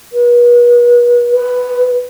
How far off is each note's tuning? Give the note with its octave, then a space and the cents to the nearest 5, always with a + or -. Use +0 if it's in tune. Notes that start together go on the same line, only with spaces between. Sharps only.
B4 -40
B4 +10